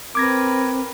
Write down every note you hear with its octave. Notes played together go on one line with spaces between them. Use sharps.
C4 A#4 B4 D6 G#6 A#6